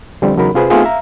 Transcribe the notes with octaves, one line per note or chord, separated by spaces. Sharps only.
F2 D3 F3 G3 C4
E2 C#3 F#3 D#4 A#4 B5
C3 F4 G#4 B4 C5
A3 B3 C4 D#4 F4 G#4
E5 F5 A#5